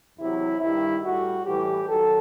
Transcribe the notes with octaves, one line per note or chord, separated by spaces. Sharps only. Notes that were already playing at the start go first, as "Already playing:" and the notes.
E2 C3 F#3 E4
G2 D#3 G3 E4
A2 G3 F#4
A2 E3 G3 G4
D#3 F#3 A4